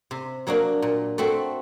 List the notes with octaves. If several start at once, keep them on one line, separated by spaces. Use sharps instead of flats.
C3
F#3 A#3 D4 F#4
A#2
A3 C4 F#4